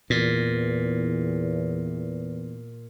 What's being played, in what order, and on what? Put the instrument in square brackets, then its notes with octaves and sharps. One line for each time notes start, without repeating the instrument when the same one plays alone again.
[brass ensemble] E2 [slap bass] A#2